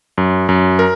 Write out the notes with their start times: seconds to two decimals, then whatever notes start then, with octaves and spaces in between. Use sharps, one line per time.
0.18 F#2
0.49 F#2
0.79 A#4